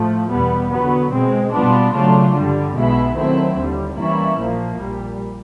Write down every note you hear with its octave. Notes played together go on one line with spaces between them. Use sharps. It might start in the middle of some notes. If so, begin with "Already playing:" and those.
Already playing: A2 F3 A3
E2 B2 G3 B3
D3 F#3 B3
B2 G#3 C4
B2 G3 B3 D4 F4
C#3 F#3 A3 D4 F4
G2 D3 G3
B1 B2 G#3 B3 E4
D#3 F#3 A3 C4 E4
D#2 D3 G3
E3 G3 A#3 C#4 E4
A#1 A#2 F3 A#3
A#1 A#2 G3